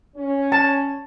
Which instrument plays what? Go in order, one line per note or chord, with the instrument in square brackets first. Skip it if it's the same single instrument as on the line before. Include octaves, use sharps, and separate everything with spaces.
[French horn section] C#4
[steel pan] A5